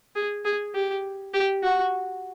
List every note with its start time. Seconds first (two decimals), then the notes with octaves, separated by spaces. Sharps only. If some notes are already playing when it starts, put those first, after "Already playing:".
0.15 G#4
0.45 G#4
0.75 G4
1.34 G4
1.63 F#4